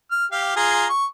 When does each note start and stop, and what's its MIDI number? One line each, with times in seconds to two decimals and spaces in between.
0.11 0.25 89
0.32 0.52 67
0.32 0.52 77
0.56 0.86 65
0.56 0.86 68
0.56 0.86 82
0.89 1.05 85